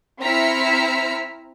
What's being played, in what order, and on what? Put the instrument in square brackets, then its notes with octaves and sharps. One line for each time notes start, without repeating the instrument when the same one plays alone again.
[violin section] C4 E4 A#5 F6 B6 C#7